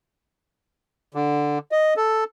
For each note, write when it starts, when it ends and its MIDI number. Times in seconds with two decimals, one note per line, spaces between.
1.14 1.58 50
1.72 1.94 75
1.97 2.24 69